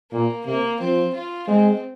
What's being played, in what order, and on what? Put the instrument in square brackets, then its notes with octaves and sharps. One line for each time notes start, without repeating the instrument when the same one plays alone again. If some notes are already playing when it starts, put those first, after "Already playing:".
[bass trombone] A#2 [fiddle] A#3
[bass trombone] C3 [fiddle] A#3
[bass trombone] F3 [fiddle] C4
[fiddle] F4
[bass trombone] G#3 [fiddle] C4